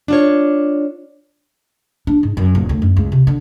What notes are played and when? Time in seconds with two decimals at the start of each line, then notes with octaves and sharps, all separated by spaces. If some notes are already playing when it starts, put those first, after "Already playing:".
0.08 D4 F4 C#5
2.07 D4
2.23 G#2
2.37 F#2
2.55 D#1
2.69 D2
2.82 F#2
2.97 C#2
3.12 C3
3.27 D3